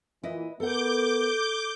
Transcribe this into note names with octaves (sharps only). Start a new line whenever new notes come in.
A#2 E3 E4 B4 D#5
B3 A4 A#4 F#5 D6 G6